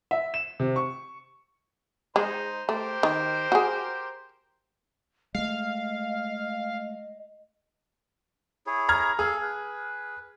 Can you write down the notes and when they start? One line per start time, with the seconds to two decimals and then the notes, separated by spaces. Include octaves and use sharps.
0.11 E5
0.34 E7
0.60 C3
0.76 C#6
2.16 G#3 D#4 C5
2.69 A3 G4 A#4 C5
3.03 D#3
3.52 F#4 G#4
5.35 G#3 A3 D#5 F5
8.67 E4 G#4 C#5
8.89 A#5 F6 G#6
9.19 G#4 A4 F5
9.42 B4